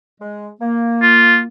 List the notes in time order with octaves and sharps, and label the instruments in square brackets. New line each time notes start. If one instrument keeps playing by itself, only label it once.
[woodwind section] G#3
A#3
[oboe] F4